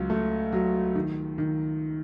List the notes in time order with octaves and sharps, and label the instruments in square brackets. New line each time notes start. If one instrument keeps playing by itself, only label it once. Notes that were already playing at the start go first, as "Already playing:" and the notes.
Already playing: [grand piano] C#2 F#3
A3
F#3
D#3
D#3